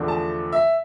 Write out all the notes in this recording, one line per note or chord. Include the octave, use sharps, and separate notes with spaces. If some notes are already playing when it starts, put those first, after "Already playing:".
Already playing: E2 D3 F3 A3 D4
A5
E5